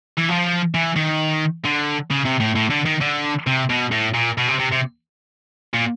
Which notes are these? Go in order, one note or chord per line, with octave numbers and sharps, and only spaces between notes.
E3
F3
E3
D#3
D3
C#3
C3
A2
A2
D3
D#3
D3
C3
B2
A2
A#2
B2
C3
C3
C3
A#2